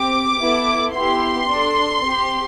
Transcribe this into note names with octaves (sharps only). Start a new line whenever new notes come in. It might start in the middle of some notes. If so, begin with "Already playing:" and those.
Already playing: C4 G4 D6
B3 E4 A4
B3 E4 G4 C6
D4 A4
C4 G4